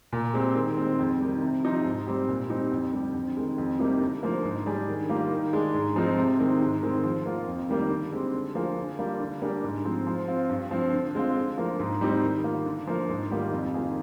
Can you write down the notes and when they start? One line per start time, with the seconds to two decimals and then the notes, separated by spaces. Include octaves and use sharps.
0.13 A#2
0.34 G#3 C4 G4
0.55 D#3
0.77 G#3 C4
0.99 F2
1.20 D#3 G3
1.42 C3
1.64 F3 C4 D#4 G4
1.85 G#2
2.07 G3 C4 G4
2.29 A#2
2.50 G3 C4 D#4 G4
2.72 F2
2.93 D3 G3
3.14 F2
3.37 D#3 G#3
3.58 F2
3.79 C3 G3 A#3 D#4
4.01 D3
4.23 F3 A#3
4.44 G#2
4.66 G3 D4 G#4
4.88 D#3
5.09 G3 A#3 F4
5.31 D#3
5.53 G#3 D4 G#4
5.74 G#2
5.96 F3 G#3 C4 D#4
6.17 C3
6.39 D#3 G#3 C4
6.61 G#2
6.82 D#3 G#3 C4
7.04 F3
7.26 A#3 F4
7.47 F2
7.69 D#3 G3 A#3
7.90 D3
8.12 G#3 C4 G4
8.34 D3
8.55 F3 A#3 F4 G#4
8.77 D3
8.99 G3 A#3 D4 F4
9.20 D3
9.42 G3 A#3 D4 G#4
9.64 G#2
9.85 F3 G#3 C4
10.07 F3
10.28 C4 F4
10.49 G2
10.71 F3 C4
10.93 D3
11.15 G#3 C4 F4
11.36 D3
11.58 F3 A#3
11.79 G#2
12.01 G3 C4 D#4
12.23 D#3
12.44 A#3 F4
12.66 D3
12.87 F3 A#3
13.09 G#2
13.31 D#3 G3 A#3 F4
13.52 F2
13.74 D#3 A#3 F4 G#4